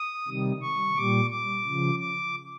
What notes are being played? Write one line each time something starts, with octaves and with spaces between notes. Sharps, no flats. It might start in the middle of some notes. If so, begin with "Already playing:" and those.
Already playing: D#6
C3 D#3 G3
C#6
A#2 G3 D6
D6
C#3 F3
D6